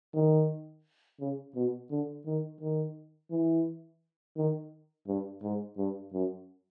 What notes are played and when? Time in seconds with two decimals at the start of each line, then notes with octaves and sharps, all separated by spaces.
0.15 D#3
1.20 C#3
1.55 B2
1.90 D3
2.26 D#3
2.61 D#3
3.31 E3
4.37 D#3
5.08 G2
5.43 G#2
5.78 G2
6.13 F#2